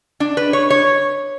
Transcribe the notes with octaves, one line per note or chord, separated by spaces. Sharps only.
D4
B4
C#5
C#5